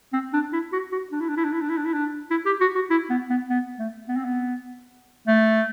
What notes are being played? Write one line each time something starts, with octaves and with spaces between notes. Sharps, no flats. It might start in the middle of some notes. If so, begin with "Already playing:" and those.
C4
D4
E4
F#4
F#4
D4
E4
D4
E4
D4
E4
D4
E4
D4
E4
D4
E4
G4
F#4
F#4
E4
B3
B3
B3
A3
B3
C4
B3
A3